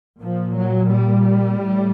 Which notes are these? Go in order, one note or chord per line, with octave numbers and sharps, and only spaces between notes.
A#2 F3
F#3
G3
A2